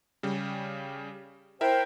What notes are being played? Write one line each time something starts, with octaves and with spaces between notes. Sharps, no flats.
C#3 G3
E4 A#4 C5 E5 G5